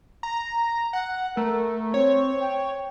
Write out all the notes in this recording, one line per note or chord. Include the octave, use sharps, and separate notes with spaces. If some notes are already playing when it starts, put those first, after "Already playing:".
A#5
F#5
A3 A#4
C4 C#5
G5